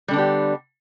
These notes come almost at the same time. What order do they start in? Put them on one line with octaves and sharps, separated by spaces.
G3 D3 D4 B3 G4